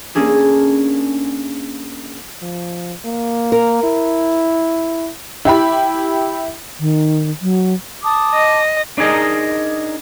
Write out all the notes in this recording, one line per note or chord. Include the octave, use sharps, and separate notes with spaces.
A#3 C#4 D4 G#4 A4
F3
A#3
A#4
E4
E4 G4 B5
D#3
F#3
A5 D6 D#6
D#5
D4 D#4 G#4 A#4 D#5